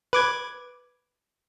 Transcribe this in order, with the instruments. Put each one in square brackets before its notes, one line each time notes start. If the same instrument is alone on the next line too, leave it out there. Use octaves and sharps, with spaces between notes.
[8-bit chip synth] B4 D6 G#6